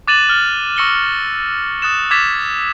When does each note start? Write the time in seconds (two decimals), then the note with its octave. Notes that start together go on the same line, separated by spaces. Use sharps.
0.08 D6 F#6 A6 D#7 E7 F#7
0.29 F6
0.77 C#6 E6 A#6 C#7 F#7 G7
1.82 D#6 F#6 A6 E7
2.11 D6 E6 G#6 A6 B6 E7